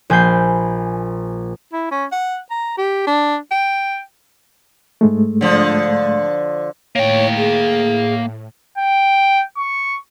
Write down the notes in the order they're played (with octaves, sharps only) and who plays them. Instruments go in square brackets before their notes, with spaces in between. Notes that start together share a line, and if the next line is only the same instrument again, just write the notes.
[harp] A#1 G#5 B5 G6 C7
[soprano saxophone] E4
C#4
F#5
A#5
G4
D4
G5
[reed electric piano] G#2 G#3 A3
[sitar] D3 F3
[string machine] A2 [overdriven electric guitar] A#3 G5 [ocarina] C#5
[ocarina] G#4
[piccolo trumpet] G5
C#6